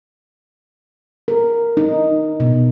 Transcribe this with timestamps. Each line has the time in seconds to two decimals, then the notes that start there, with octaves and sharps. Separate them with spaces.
1.28 A#4
1.77 D#4
2.40 B2